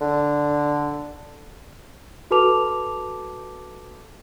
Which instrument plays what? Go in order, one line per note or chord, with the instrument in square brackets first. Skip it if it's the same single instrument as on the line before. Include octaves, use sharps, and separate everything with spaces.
[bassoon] D3
[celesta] F#4 A4 B4 A5 D6 F7